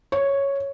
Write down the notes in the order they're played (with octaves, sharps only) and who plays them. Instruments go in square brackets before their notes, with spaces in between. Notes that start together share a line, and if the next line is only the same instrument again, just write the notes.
[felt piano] C#5